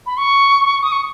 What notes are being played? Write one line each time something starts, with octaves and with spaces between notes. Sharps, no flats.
B5
C#6
D#6
C#6